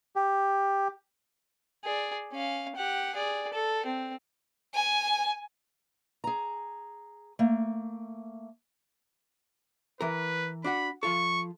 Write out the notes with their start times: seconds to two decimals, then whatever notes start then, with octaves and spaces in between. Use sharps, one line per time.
0.16 G4
1.84 G#4 D5
2.32 C#4 F5
2.76 G4 F#5
3.15 G#4 D5
3.53 A4
3.86 C4
4.74 G#5
6.24 G#4 A#5
7.39 A3 A#3
10.01 E3 A#4 B4
10.64 D4 F#4 F#5 B5
11.03 F3 F4 A4 C#6